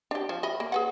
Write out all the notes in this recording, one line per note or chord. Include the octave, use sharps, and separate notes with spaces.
D4 G4
F3
D#5 E5 B5
A#3
G#4 B4 F#5